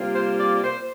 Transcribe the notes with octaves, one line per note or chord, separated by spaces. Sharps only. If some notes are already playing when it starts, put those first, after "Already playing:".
Already playing: C3 G3 A#3 F4
C5
D5
C5